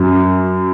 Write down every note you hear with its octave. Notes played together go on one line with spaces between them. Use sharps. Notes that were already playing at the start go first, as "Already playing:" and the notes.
Already playing: F#2